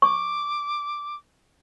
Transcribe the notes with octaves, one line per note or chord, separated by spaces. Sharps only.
C#6 D6